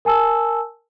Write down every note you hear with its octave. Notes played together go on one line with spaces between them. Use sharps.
A#4 G#5 A5 E6